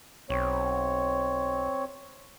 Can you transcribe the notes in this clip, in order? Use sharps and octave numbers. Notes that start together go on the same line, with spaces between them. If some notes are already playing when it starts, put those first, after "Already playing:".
B1 C4 C#5